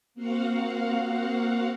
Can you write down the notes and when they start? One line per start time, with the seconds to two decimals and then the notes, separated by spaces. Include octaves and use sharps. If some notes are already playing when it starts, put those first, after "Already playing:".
0.14 A#3 C4 F#4 F5 F#5